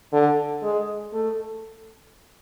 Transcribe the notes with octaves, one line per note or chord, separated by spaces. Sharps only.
D3
G#3
A3